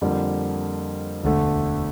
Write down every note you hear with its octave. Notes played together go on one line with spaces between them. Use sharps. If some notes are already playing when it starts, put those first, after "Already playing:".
F2 D3 G3 A#3
E1 D2 D3 A3